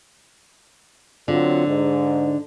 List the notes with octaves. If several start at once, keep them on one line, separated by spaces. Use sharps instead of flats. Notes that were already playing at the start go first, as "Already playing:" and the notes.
D3 F#3 C4 F4
G#2